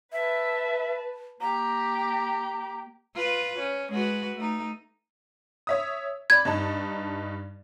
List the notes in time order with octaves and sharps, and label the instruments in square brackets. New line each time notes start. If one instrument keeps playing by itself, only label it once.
[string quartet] B4 A5 [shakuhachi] E5
[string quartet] A#3 G4 [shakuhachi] A#5
[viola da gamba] F4 B4
C#4
G#3 F#4 B4
A3 D#4
[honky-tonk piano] C#5 E5 D#6
[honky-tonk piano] D5 B5 [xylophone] G#6
[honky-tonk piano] G2 D#4 A5